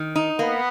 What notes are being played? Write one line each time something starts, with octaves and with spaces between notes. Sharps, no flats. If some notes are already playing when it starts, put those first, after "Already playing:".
Already playing: D#3
D#4
A#3 B3